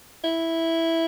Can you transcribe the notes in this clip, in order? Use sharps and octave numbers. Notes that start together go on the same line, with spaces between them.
E4